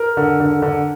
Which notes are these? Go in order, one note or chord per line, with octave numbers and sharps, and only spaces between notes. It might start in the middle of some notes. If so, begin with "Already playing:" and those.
Already playing: A#4
D3
D3
D3